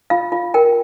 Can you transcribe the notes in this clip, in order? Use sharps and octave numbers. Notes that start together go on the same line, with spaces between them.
F4 F5
F4
A#4 G5